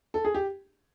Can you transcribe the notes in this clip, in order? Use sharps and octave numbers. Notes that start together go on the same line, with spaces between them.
A4
G#4
G4